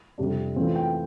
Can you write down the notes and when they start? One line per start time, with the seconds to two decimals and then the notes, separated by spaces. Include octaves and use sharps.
0.18 F2 C3 G3 D4
0.56 E3 A3 C4 F4
0.76 G5